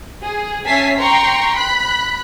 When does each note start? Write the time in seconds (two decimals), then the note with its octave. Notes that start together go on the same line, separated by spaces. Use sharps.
0.21 G#4
0.66 C#4 E5 G#5 A5 B6 C7
0.98 G5 A#5 C6 C#6
1.57 B5 F#6